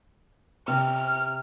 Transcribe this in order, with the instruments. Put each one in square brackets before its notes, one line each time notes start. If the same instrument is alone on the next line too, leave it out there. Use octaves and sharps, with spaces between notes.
[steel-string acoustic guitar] C3 [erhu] F6